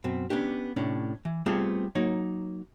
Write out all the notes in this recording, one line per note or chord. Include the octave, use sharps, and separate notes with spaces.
F#2 B2 C4
B3 C#4 D4 G4
A2 C3 C#4 D4
E3
G3 A3 B3 C4 F4 G#4
F#3 A#3 D#4 C#5